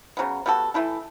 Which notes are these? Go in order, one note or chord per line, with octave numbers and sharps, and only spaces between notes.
C#3 F#3 B3
G3 B3 F#4 A4
E3 A3 E4 A4